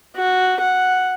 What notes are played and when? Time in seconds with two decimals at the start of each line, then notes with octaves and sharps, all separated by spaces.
0.16 F#4
0.61 F#5